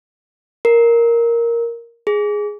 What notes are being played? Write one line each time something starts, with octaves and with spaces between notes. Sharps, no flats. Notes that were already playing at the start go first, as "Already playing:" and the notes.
A#4
G#4